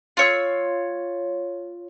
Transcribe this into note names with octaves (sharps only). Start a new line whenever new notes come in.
F4 C#5 E6